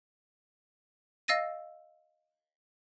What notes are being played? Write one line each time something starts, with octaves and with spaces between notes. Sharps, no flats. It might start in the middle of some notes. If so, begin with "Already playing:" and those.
D#5 F5 E6 A6 A#6 D#7